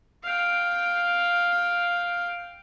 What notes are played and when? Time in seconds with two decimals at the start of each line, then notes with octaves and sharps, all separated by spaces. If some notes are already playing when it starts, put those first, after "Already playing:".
0.23 F5 G5